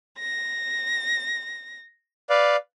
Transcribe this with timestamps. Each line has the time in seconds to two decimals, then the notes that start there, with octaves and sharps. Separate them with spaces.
0.18 A#6
2.30 B4 D5 F5